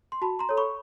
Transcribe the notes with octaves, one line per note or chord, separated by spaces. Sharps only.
C6
F#4 A5 B5
A#5 C6
A4 C#5
B5 C#6